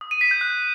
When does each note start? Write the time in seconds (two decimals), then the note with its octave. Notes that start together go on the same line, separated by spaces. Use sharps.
0.01 D#6
0.11 D#7
0.21 B6
0.31 G6
0.41 F#6